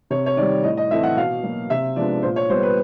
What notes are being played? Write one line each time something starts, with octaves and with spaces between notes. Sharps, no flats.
C3 C#5
C#5
D#3 G3 D5
A2 D#5
D#5
E3 A3 C4 E5
F#5
B2 F5
F#3 A#3
C3 E5
F3 G#3 B3 D4 D5
A#2 C5
C#5
G3 B3 C5
B4